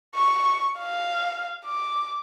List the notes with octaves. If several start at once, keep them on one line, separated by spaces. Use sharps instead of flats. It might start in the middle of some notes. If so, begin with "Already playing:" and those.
C#6
F5
D6